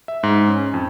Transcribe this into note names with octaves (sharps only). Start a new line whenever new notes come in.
E5
G#2
C#4
F2